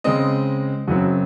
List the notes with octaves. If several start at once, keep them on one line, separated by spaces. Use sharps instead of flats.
C#3 G#3 C4 D#5
F#2 C#3 F#3 C4 F#4